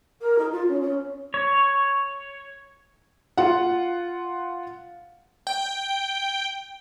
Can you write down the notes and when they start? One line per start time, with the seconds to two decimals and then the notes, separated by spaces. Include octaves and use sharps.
0.21 A#4
0.38 D#4
0.52 F4
0.68 C#4
0.81 C#4
1.34 C#5
3.37 F4 F#5
5.47 G5